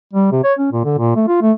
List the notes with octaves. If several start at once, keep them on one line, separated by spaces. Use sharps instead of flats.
G3
C3
C#5
C#4
A#2
D3
A#2
A3
F4
A3